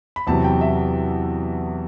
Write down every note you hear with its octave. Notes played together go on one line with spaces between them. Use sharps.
B5
E2 C3 F#3 A5
G5
E5